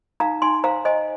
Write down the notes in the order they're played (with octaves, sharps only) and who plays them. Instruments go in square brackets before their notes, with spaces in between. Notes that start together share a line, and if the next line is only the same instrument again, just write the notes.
[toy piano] D#4 F5 A#5
D#4 G#5 C6
C5 F5 A#5
C5 D#5 G#5